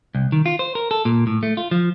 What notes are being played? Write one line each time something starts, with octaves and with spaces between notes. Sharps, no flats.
C2
D#3
F4
C5
A#4
A4
A#2
A2
A3
F4
F3